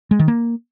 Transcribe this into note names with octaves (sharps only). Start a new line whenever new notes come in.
G#3
D#3
A#3